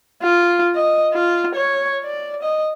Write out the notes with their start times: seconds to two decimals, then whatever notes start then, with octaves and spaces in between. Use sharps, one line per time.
0.22 F4
0.75 D#5
1.14 F4
1.55 C#5
2.04 D5
2.42 D#5